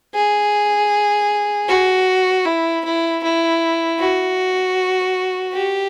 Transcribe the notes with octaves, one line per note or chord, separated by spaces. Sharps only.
G#4
F#4
E4
E4
E4
F#4
G4